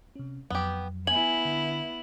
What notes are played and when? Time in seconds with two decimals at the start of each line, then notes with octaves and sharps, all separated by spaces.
0.16 C3 C#4
0.50 F2 F#3 B3 G4
1.07 B3 E4 G#5 F#7
1.45 D3